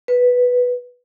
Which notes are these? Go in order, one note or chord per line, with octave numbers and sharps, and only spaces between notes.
B4